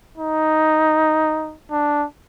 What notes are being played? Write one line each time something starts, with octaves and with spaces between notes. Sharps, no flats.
D#4
D4